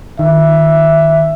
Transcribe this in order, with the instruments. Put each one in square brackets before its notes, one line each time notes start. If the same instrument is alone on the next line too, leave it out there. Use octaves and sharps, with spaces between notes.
[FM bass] D#3 [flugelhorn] E5